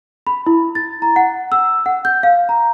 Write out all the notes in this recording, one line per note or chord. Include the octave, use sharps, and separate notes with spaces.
B5
E4
A6
A#5
F#5
E6
F#5
G6
F5
A#5